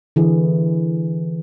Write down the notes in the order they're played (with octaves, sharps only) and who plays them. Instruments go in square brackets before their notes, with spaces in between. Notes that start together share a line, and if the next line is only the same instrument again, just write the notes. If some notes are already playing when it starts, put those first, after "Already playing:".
[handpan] D3 E3 G#4